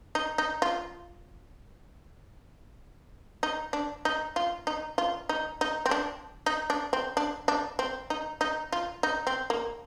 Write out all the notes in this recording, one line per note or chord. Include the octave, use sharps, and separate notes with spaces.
D#4
D#4
F4
D#4
D4
D#4
F4
D#4
F4
D#4
D#4
C4
D4
D#4
D4
C4
D4
D4
C4
D#4
D#4
F4
D#4
C4
A#3